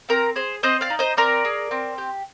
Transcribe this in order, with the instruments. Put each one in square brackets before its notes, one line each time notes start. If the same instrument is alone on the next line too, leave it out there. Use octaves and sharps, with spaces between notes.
[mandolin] C4 A#4
G#4 C5
C4 C5 D#5
D5 F5
D#4
C5 D#5
C4 A#4 D5
G#4
C4
G4